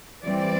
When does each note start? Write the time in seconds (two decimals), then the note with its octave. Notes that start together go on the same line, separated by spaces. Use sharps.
0.24 E3 G3 C4 D5